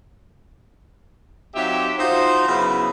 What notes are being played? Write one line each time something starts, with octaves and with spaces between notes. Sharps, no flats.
F#3 C4 D#4 F4 G4 E5
D#4 F4 F#4 C5
C#3 F#3 B3 E4